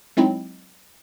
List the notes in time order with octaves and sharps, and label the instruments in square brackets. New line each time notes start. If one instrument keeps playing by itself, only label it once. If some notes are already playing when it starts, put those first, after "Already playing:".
[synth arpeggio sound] F#3 G#3 C4 D#4 E4